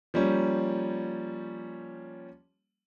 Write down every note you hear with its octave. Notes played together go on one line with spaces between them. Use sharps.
F3 G3 A#3 C#4